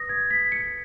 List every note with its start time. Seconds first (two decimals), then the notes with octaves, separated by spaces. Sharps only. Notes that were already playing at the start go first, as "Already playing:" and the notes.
Already playing: B4 D#6 A#6
0.09 G#6
0.30 B6
0.52 C#7